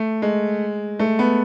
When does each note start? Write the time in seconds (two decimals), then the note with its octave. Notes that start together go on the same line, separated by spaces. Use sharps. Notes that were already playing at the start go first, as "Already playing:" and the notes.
Already playing: A3
0.22 G#3
0.99 A3
1.19 B3